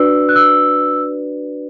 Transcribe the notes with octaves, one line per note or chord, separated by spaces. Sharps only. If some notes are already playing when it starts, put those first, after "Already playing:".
Already playing: D4 F#4 B4 D5 E6
F#6
E6